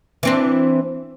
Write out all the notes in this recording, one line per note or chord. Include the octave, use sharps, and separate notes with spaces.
E3 C4 D4